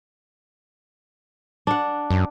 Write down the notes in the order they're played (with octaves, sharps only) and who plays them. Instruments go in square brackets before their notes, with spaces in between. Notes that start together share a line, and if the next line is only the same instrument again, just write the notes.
[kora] D4 F#5
[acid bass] F#2